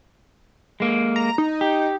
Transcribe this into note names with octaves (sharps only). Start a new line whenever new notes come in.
G#3 A#3
A#5
D#4
G4